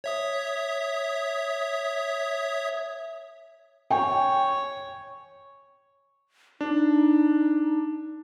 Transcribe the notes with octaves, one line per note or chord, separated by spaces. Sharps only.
C#5 E5 D#6
C#5 G5 G#5
D4 D#4